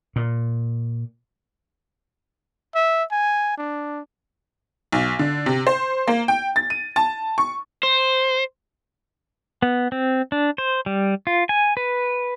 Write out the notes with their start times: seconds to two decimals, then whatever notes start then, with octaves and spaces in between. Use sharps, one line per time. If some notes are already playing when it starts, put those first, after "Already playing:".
0.16 A#2
2.75 E5
3.12 G#5
3.58 D4
4.93 B1
5.19 D3
5.46 C3
5.67 C5
6.08 A#3
6.28 G5
6.56 A6
6.70 D#7
6.96 A5
7.38 C#6
7.83 C5
9.62 B3
9.92 C4
10.32 D4
10.58 C5
10.86 G3
11.27 F4
11.49 G#5
11.77 B4